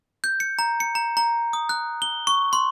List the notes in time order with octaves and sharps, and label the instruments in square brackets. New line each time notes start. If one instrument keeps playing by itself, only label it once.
[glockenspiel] G6
C#7
A#5
C#7
A#5
A#5
D#6
F#6
G7
C#6
C6